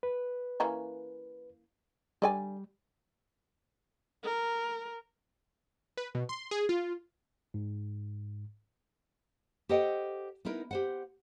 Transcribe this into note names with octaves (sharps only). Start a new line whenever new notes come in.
B4
E3 A#3 C#4
D3 G3 D5 G#5
A#4
B4
B2
C6
G#4
F4
G#2
G4 A4 C5 D#5 F#5 G5
B3 D#4 E4 A#4
G4 C5 F#5